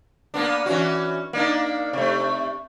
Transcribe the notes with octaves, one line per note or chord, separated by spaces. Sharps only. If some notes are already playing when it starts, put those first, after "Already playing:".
A#3 B3 D4
E3 C#4 F#4
A#3 D4 D#4
C3 A3